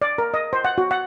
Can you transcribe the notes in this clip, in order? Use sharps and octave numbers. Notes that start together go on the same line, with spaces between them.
D5
A#4
D#5
C5
F#5
F#4
F#5